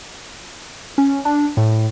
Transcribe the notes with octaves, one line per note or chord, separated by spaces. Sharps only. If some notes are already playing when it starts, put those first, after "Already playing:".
C#4
D4
A2